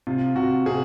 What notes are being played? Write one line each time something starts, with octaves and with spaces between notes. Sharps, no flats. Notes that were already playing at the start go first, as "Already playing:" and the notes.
C3 F4
C3 F#4
C3 G#4